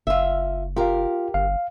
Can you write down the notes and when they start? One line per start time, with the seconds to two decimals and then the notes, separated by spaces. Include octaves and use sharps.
0.07 F#1 F4 E5
0.76 F4 G4 A#4 F5
1.34 G1 F5